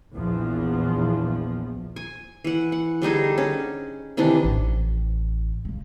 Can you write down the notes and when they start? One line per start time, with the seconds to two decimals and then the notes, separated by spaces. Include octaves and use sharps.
0.13 A#1 E2 F3
1.96 G#5
2.44 E3 F#5
2.72 F#5
3.02 D3 G3 D#4 G#4
3.38 C#4
4.17 C3 D#3 E3 D4
4.44 A1
5.65 C#3 G#3